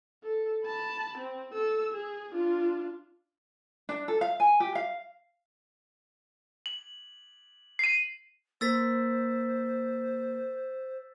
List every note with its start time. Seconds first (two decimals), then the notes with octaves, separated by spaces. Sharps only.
0.24 A4
0.64 A5 B5
1.18 C4
1.53 A4 E6
1.93 G#4
2.32 D4 F4
3.89 D4
4.08 A4
4.21 F5
4.40 G#5
4.60 G4
4.75 F5
6.66 F#7
7.79 C7 D#7
8.61 A#3 A#4 C5 E6 A6 B6